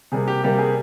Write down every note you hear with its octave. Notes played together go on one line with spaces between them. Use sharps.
C3 G3 A#3 G#4
G4
C3 G3 A#3 G4
G#4